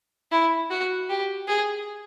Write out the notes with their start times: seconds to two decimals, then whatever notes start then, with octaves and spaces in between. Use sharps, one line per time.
0.31 E4
0.70 F#4
1.09 G4
1.47 G#4